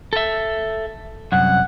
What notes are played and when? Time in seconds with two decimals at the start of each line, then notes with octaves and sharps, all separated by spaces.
0.13 A4 E5
1.32 C2 F#2 F#5